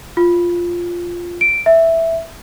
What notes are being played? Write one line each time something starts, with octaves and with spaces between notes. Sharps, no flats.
F4
D7
E5